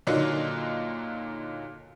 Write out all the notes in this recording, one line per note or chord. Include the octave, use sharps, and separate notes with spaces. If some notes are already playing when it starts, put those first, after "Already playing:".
A#2 D3 F#3 A#3 D#4